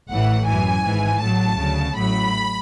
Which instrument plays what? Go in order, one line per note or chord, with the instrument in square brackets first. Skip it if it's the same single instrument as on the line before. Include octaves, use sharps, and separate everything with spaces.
[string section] A1 A2 E3 F#5
F#2 E3 G#5
G#1 G#2 E3
A1 A2 F#3 A5
D2 C#3 F#3
A1 A2 F#3 B5